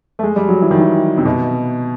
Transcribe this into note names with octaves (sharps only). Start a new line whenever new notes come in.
A3
G#3
G3
F#3
E3
D#3
E3
C3
B2